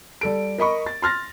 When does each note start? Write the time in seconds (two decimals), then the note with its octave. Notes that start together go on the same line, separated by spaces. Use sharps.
0.21 G3 A4 D7
0.58 A#4 D#5 B5 C#6
0.86 A6
1.02 C6 F6 A6 A#6